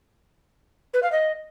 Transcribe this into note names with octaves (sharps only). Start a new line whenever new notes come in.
B4
F5
D#5